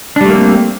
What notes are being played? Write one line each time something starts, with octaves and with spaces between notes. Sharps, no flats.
G3 A3 A#3 C4 D4